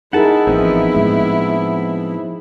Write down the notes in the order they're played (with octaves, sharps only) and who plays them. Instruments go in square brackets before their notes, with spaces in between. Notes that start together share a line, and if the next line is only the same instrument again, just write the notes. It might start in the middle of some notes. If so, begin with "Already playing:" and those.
[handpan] D#4 G#4 A#4 [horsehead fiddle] E4 [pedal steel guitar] F#5 A5
[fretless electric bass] A1 [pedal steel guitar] F3 B3 C4
[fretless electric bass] A2 G#3